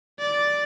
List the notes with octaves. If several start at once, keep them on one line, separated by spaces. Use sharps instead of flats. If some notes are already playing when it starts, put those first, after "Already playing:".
D5